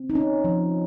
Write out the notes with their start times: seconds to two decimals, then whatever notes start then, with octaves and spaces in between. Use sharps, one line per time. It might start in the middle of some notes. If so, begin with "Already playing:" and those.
Already playing: C4
0.10 D#4
0.15 C#4
0.44 F3